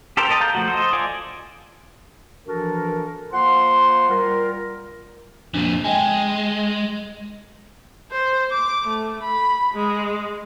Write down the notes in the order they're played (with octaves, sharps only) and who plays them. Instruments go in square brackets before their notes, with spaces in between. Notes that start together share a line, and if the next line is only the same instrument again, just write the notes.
[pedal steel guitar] G4 A4 A#4 C5
A4 A#4 D#5 A5
F5 A#5 G6
F3 A3 F#4
A4 C5 D5 D#5
F4 D5 G#5
[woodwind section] E3 F3 D4 F#4 A4 A#4
A#3 F4 C5 F#5 C6
G3 F4 A#4
[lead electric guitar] F2 A#2 [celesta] D4
[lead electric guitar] G#3 [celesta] D#5 G5 G#5
[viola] C5
D6
A3
B5
G#3